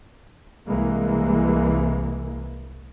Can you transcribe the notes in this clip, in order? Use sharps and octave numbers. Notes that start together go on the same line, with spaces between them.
C2 E3 G#3 A#3